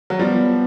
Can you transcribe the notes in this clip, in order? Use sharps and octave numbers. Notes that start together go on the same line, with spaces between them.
F#3
F3 G3 B3